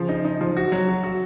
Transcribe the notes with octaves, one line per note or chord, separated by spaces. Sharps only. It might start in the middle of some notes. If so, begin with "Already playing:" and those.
Already playing: C#3 F3
D#4
D#4
F3
F#4
F#3
F#4
F#4